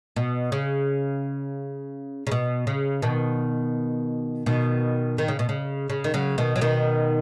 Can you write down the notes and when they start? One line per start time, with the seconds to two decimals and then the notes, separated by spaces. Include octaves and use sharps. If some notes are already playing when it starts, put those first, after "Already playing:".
0.16 B2
0.52 C#3
2.27 C#3
2.31 B2
2.67 C#3
3.02 B2 D#3
4.46 B2 D#3
5.18 D#3
5.28 C#3
5.39 B2
5.49 C#3
5.90 C#3
6.04 D#3
6.14 C#3 F#3
6.38 B2 D#3
6.56 F#3
6.61 B2 D#3